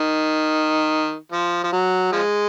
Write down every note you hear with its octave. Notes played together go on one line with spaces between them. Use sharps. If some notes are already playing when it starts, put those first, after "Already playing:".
Already playing: D#3
F3
F3
F#3
F3 G#3